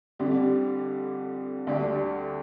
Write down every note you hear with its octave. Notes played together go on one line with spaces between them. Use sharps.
F2 D3 G3
D2 D3 G3 D4 G4